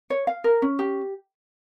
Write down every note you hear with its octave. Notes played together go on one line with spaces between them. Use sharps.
C#5
F5
A#4
C#4
G4